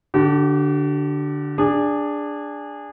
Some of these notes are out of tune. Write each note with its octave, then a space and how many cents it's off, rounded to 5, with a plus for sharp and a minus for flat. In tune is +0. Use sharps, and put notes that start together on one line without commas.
D3 +0 G4 -45
D4 +0 G#4 -20